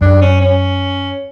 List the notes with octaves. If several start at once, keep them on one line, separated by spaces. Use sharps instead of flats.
F#2 D4
C#4
C#4